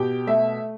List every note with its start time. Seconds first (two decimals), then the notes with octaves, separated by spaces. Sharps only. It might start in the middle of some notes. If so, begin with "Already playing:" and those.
Already playing: B2 G4 G5
0.27 A3 E5